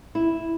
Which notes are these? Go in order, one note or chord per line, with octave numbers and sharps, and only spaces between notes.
E4